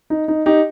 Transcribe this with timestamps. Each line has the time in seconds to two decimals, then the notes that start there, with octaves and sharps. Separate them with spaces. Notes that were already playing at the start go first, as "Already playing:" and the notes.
0.10 D#4
0.28 D#4
0.46 D#4 G4